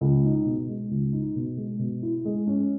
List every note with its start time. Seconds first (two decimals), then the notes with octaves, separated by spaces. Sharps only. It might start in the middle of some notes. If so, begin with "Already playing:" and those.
0.01 C#2
0.24 D#4
0.46 B2
0.68 G#3
0.91 C#2
1.13 D#4
1.36 B2
1.57 G#3
1.79 B2
2.02 E4
2.25 G#3
2.47 C#4